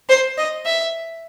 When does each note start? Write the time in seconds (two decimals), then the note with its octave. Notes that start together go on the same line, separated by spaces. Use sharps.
0.09 C5
0.38 D#5
0.65 E5